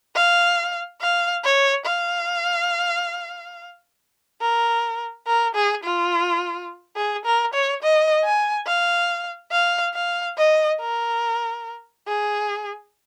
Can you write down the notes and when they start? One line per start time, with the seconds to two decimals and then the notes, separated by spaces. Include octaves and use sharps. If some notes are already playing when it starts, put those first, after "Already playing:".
0.15 F5
1.01 F5
1.44 C#5
1.86 F5
4.41 A#4
5.27 A#4
5.55 G#4
5.84 F4
6.96 G#4
7.25 A#4
7.54 C#5
7.82 D#5
8.24 G#5
8.66 F5
9.52 F5
9.94 F5
10.37 D#5
10.80 A#4
12.07 G#4